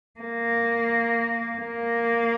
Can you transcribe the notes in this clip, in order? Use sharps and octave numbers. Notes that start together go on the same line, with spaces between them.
A#3
A#3